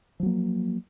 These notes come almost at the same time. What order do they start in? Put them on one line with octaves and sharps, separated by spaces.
F3 F#3 A#3